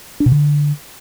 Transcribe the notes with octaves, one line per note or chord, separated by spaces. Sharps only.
D4
B2
D3